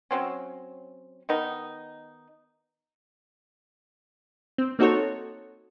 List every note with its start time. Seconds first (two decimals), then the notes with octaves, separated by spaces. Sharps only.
0.11 F#3 C4 C#4
1.29 D#3 B3 D#4
4.58 C4
4.79 A#3 C4 D#4 F#4 A4 C#5